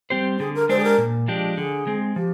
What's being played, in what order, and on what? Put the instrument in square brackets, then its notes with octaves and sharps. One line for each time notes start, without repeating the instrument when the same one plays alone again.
[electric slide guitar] G3 C4 G4 C5
[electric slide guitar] D3 [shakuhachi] G#4
[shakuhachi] A#4
[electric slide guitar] G#3 D4 G4 [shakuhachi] C5
[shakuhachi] G#4
A#4
[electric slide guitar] A#2
F3 G#3 D4 G4
[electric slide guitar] D3 [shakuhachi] G#4
[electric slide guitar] G#3 C4
[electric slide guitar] F3 [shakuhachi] G4